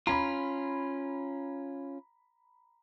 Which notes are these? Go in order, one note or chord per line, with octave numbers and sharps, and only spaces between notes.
C#4 F4 A#5 B5